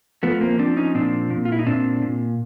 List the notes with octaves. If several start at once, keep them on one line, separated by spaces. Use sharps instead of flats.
F3 A3 B3
A#3 C4
F3 C4 D4
C#4 D#4
A#2 C4 D4
A#2
F4
E4
D#4
A#2 C4 D4
A#2